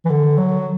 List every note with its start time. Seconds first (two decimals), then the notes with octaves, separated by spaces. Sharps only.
0.05 E3
0.10 D3
0.38 F#3